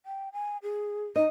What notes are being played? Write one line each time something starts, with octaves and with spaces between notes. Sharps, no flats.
G5
G#5
G#4
D#4 D#5